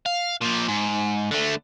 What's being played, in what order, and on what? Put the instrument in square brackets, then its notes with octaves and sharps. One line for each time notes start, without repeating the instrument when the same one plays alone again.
[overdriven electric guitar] F5
A#2 F3
G#2
D3 A3